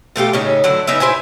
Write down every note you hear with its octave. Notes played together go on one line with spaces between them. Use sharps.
B2 A3 F4 G4
A2 C#3 C#4 D#4
D3 F#3 A3 E4
C#3 D#4 B4 E5
E4 C5 E5 G#5